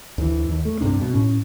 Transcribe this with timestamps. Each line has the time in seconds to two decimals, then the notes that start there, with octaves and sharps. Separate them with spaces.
0.18 D2 E3
0.49 D#2
0.65 A3
0.81 C2 G2 C3 D4
1.01 B2
1.13 A2 C#4